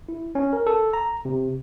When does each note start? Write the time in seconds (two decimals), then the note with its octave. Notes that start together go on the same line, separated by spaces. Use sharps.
0.09 E4
0.35 C#4
0.53 A#4
0.67 A4
0.93 A#5
1.25 C3